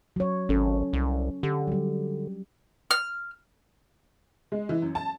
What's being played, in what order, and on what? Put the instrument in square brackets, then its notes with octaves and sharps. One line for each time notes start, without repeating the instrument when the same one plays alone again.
[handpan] F#3 C#5
[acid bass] G#1 [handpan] C#4 A4
[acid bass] C2
[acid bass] D3 [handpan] G4
[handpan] F#3 G3
[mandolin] F6
[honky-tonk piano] G#3
E3
F#2
A5